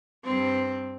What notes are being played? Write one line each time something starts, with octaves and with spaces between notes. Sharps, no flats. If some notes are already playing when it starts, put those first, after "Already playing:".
G2 C4